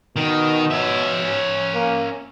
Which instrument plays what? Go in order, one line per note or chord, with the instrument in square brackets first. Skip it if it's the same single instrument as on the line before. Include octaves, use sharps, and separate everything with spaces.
[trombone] B2 [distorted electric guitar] D#3
[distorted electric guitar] C#4 E5
[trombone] A#3